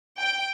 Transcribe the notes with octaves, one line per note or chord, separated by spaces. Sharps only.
G5